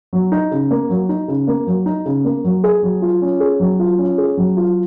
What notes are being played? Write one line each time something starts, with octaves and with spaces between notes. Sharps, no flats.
F#3
D#4
C#3
A#3
F#3
D#4
C#3
A#3
F#3
D#4
C#3
A#3
F#3
G#4
F#3
F4
C#4
G#4
F#3
F4
C#4
G#4
F#3
F4